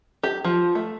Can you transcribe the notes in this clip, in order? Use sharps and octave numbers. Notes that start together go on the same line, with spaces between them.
G4
F3
A3